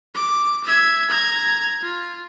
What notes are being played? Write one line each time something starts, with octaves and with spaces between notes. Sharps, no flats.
D6
E5 G#6
A#5 G#6
F4